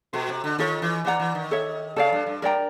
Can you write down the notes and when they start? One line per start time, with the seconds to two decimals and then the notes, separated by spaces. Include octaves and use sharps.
0.13 B2 F#4 A4 C5
0.29 C3
0.44 D3
0.59 D#3 F4 A4 C#5
0.82 E3
1.04 E3 B4 D5 F#5 A#5
1.20 E3
1.35 D#3
1.51 A4 C#5 E5
1.96 C#3 A4 D5 F5
2.12 G2
2.26 G2
2.42 G2 A#4 D5 G5 A#5